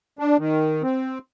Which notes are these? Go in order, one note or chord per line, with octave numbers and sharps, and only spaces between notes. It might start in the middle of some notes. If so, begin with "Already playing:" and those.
D4
D#3
C4